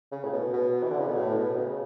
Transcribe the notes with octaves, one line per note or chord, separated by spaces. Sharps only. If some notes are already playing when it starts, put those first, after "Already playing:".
C#3
A2
B2
B2
E3
D3
C#3
B2
A2
B2
C#3